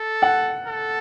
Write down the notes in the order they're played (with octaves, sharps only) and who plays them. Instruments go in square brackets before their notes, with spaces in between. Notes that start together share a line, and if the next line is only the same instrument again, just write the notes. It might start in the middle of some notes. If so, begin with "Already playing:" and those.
Already playing: [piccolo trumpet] A4
[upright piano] F#5
[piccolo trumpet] A4